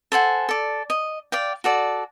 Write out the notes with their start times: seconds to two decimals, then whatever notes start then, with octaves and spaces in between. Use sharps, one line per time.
0.12 A4 C5 F#5 G#5
0.49 A4 D5
0.90 D#5
1.32 D5 F5 G5
1.64 F#4 A4 D5